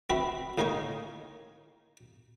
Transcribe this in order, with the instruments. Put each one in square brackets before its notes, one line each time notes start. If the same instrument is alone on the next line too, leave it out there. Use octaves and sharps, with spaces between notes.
[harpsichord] C4 F#4 B4 E5
A2 A#3 D#4 A#4 G#5 C#6